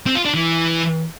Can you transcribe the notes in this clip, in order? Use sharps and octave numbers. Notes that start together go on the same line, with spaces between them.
C4
F4
D4
E3